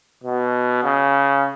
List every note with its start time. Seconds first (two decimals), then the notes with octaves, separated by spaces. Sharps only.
0.24 B2
0.84 C#3